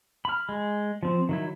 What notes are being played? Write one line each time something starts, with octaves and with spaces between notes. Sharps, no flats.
B5 F6
G#3
F3 C4
D#3 F#3 E4